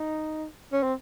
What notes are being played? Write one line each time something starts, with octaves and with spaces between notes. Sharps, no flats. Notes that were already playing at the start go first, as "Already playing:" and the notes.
Already playing: D#4
C#4
C4